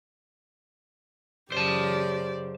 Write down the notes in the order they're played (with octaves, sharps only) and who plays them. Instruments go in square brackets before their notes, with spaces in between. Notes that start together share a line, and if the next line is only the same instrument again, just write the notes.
[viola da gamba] F#2 C#3 [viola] G4 D5 [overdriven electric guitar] C5 A5